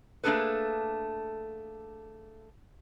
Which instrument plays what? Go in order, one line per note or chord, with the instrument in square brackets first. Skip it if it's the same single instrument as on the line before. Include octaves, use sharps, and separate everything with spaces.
[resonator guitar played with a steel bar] A3 A#3 D4 G#4 A4 B4